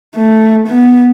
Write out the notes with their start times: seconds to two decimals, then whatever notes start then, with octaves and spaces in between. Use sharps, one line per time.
0.15 A3
0.68 B3